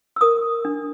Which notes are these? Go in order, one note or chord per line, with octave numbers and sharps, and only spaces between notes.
E6
A#4 D#6
D4